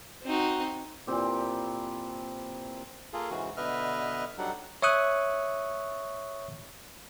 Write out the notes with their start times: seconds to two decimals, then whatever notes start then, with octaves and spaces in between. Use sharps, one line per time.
0.23 C4 D#4 F#4
1.07 A#2 E3 C4 G4
3.13 A#3 F4 G#4 A4
3.31 G#2 C#3 E3 F#4
3.57 B2 D3 B4 D#5 E5 F6
4.38 F#3 G3 D4 D#4 A4 F#5
4.82 C#5 E5 C#6 D#6 F#6